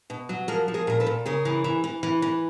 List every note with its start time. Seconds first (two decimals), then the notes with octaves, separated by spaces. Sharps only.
0.10 B2
0.29 F#3
0.48 F3 G#4 A#4
0.68 F3
0.74 G#4 A#4
0.87 A#2 A#4
1.00 A4 B4
1.07 A#2
1.26 C#3 G#4 A#4
1.45 E3
1.64 E3
1.84 E3
2.03 E3
2.22 E3